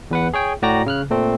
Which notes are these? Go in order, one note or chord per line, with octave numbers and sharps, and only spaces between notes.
E2 B4 F#5
G#4 C#5 G5
A2 F#4 D5 G5 A#5 A#6
C#3 F6 F#6
A#2 A3 C4